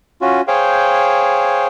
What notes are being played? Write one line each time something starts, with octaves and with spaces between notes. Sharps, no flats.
C#4 F4 F#4
G#4 C5 C#5 F5 G5